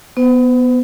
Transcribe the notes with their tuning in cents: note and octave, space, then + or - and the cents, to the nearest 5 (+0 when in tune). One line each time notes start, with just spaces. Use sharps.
B3 +0 C5 -45